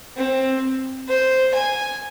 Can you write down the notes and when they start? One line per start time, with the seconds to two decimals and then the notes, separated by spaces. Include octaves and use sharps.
0.17 C4
1.09 C5
1.54 G#5